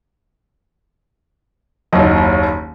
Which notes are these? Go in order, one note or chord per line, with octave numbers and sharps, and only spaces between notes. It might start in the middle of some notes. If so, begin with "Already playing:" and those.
F#1 D#2 F#3 D#5